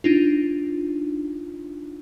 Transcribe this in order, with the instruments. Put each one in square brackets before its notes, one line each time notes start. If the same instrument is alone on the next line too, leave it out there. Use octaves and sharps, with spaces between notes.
[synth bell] D4 D#4 F4